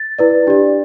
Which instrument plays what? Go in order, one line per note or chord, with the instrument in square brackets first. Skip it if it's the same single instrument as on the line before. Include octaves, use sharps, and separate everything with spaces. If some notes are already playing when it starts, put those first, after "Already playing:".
Already playing: [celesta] A6
E4 B4 D5
D4 G4 D5